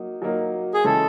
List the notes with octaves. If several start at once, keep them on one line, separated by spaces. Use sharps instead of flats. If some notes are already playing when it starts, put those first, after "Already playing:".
Already playing: F#3 A#3 D#4
F#3 A#3 D#4
G#4
C#3 E3 G#3 C#4 A4